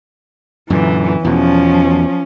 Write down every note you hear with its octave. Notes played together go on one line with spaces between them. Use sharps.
F#2 A#2 D3 E3
E2 B2 F3 C#4